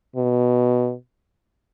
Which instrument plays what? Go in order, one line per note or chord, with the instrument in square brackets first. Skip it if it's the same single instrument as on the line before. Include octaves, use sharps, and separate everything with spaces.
[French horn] B2